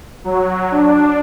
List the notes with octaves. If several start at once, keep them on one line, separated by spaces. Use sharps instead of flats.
F#3
D4